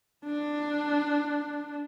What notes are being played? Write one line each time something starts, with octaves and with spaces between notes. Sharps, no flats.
D4